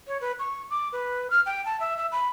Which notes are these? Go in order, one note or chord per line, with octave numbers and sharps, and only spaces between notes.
C#5
B4
C#6
D6
B4
F6
G5
A5
E5
E5
B5